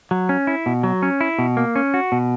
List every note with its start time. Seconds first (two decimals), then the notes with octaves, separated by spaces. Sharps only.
0.11 F#3
0.29 C#4
0.47 E4
0.66 B2
0.83 F#3
1.03 C#4
1.21 E4
1.39 B2
1.57 A#3
1.76 C#4
1.94 F#4
2.12 B2